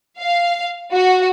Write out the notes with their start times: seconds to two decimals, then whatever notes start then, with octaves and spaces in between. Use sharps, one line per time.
0.19 F5
0.91 F#4